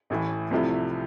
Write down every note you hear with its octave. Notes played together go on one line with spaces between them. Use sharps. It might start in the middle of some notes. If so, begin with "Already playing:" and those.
A1 A2 E3
C2 C3 F3 A3 E4